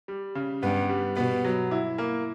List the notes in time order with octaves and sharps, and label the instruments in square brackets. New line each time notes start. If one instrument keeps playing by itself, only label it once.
[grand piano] G3
C#3
[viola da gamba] G2 [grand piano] B3
[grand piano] G3
[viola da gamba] B2 [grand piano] B3
[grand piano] F#3
E4
A#3